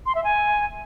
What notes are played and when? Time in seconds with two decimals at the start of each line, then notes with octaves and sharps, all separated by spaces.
0.06 C6
0.15 E5
0.24 G#5